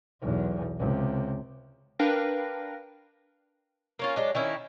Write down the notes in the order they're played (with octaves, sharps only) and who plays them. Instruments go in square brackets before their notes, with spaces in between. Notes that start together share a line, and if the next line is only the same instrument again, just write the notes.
[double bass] B1 E2
C#2 C3
[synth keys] D4 A#4 B4 F5 G5 A#6
[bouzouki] A#3 C#4 F4
F#3 G#3 D4
D#3 C#4 E4